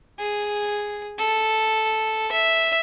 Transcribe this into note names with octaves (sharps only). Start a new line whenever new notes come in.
G#4
A4
E5